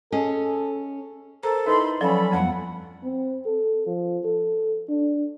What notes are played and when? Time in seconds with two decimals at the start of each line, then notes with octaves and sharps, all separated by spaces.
0.12 C#4 G#4 A4 D#5
1.43 A4 A#4 C5 A#5
1.66 D#4 E4 B4 B5 C6
2.01 F3 F#3 C#4 A4 D5 B5
2.32 G1 F2 F3 B3 F#5
3.03 C4
3.46 A4
3.87 F3
4.25 A4
4.89 D4